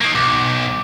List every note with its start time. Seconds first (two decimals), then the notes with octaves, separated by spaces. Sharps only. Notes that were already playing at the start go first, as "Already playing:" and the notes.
0.01 D#3 A#3
0.15 B1 D6